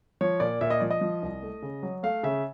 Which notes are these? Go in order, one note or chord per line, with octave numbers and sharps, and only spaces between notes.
F3 C#5
A#2 D5
A#2 E5
D#5
F3 D5
D#5
F3
C2
A3
C#3
F#3
A3 F5
C#3 E5